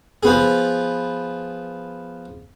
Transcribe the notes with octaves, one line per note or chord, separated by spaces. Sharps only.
F3 B3 G#4